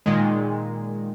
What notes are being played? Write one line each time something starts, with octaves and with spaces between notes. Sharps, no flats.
A#2 D#3 G#3